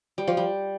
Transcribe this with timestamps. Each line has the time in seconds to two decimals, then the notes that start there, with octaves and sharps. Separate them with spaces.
0.18 G3
0.27 F3
0.37 G3